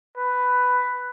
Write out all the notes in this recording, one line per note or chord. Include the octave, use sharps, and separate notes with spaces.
B4